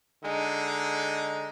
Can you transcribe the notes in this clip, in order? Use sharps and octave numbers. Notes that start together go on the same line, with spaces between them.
D3 G#3 D#4